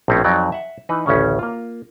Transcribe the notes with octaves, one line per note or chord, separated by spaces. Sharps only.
A#1 A2 C4 C#4
F2 F#3 D#4 D5
E5 F#5
E3 D#4 B4
A1 D2 C#3 C#4
A#3 F4